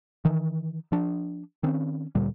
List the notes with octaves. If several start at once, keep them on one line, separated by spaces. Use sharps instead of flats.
D#3 E3
F3 D4
D#3 C4 C#4
D2 A#2 G3